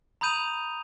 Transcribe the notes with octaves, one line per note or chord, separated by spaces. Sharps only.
A#5 B5 D#6 G6 D#7 F7